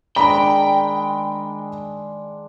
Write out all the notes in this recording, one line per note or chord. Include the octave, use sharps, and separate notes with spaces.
D#3 G#3 D4 G5 A#5 B5